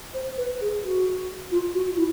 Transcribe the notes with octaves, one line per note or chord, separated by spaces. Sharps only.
C5
B4
G#4
F#4
F4
F#4
E4